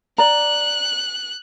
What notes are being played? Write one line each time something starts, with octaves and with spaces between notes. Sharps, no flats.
D5 A#5 F#6